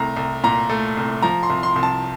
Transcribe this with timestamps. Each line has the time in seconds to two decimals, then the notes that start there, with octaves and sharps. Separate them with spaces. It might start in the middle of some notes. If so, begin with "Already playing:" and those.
Already playing: C2 A3 A#5
0.17 C2
0.44 A#2 A#5
0.70 A3
0.97 C2
1.22 F3 A#5
1.43 C6
1.50 C2
1.63 C6
1.76 C2
1.83 A5